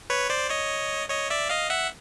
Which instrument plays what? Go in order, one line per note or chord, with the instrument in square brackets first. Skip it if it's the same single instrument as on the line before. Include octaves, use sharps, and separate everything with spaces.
[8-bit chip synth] B4 C#5
C5 D5
C#5 D#5
C#5 D#5
D5 E5
D#5 F5
E5 F#5